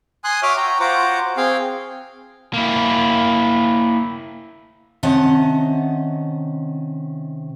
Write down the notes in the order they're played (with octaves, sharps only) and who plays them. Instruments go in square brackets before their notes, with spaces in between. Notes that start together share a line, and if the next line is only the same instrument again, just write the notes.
[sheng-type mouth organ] G#5 C6 D#6 F#6
F#4 C#5 E5 D6 D#6 F6
F#4 G5 A#5
F4 F#4 C5 F#5 A#5 D6
C4 G#4 F5 G5
[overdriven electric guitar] A#3 E4
[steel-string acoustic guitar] C3 D#3 C#4 D#5 F#5 A5